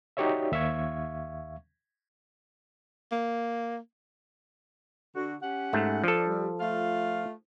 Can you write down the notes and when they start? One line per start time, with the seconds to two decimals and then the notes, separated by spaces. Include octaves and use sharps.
0.17 D#4 F#4 G4 C#5 D5 E5
0.52 D#2 E5 F5 C#6 G#6
3.12 A#3
5.15 D3 F#4
5.42 C#4 G4 F#5
5.73 G#2 A3
6.04 F3 D4 A4
6.28 G3
6.60 A3 F4 F5